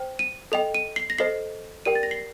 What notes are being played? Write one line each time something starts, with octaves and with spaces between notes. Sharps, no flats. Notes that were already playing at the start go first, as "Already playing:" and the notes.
Already playing: C5 G5
D#7
A4 D#5 G5 F7
D#7
C7
A#6
A4 C5 D#5 C7
G4 A#4 D5 G5 D#7
A6
A#6
C7